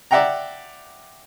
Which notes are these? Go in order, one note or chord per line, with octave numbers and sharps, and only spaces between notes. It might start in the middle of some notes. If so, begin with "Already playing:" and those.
D5 E5 F#5 G5 A#5